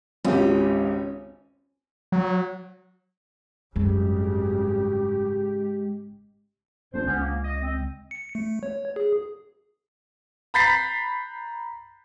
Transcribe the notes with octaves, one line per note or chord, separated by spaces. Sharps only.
G#1 C#2 C#4 G4
F#3
G#1 F#2 C#3 G3 G#3 G4
D#1 A#2 A3 C4 D4 C5
C#2 B3 C#4
A#3
D#5
C4
C#7
A3
C#5
G#4
A#5 B5 G6 A6 B6 C7